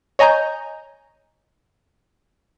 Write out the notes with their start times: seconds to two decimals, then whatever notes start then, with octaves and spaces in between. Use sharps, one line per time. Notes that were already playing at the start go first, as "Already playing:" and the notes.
0.19 C#5 D#5 G#5 A#5 G6